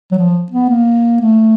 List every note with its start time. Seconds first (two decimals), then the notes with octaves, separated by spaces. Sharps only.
0.12 F#3
0.18 F3
0.52 B3
0.70 A#3
1.22 A3